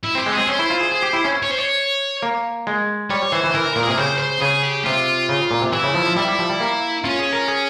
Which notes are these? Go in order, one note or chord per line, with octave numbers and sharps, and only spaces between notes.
E4
C4 G4
G#3
C4 G#4
C#4 C5
E4
F4
G#4
G#4
G4
E4
C#4
C#5
C5
C#5
A#3
G#3
G3 C#5
E3 C5
E3
E3 A#4
A#2 A#4
G#4
C3 A#4
C#3 C5
C5
C#3 G#4
G4
C3 F4
C#3
A#2
C3
E3 E4
C#3
F3
F3
G3 E4
G3
F3
G3
A#3
C#4 F4
G#4
A#4
G#4